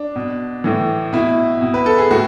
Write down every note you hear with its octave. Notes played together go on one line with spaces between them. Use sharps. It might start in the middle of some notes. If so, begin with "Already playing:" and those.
Already playing: D4
B2
A2 E3
B2 E4
B2
B4
A4
G#4
A2 F#4